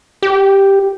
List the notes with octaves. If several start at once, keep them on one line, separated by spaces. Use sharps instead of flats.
G4